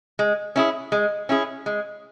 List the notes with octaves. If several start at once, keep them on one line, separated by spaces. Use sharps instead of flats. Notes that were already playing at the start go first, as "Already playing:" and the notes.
G#3
C#4 E4 G#4
G#3
C#4 E4 G#4
G#3